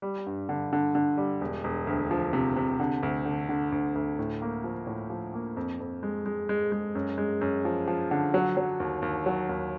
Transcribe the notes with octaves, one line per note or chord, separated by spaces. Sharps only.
G3
G2
D3
D3
D3
G3
E1
E1
D2
F3
C3
C3
D3
D2
D3
D3
D2
D2
A2
A#3
F3
A2
F3
A#3
F2
F2
G#3
G#3
G#3
G#3
F#2
G#3
F#2
F3
F3
D3
F#3
F#3
D#2
D#2
F#3
D#2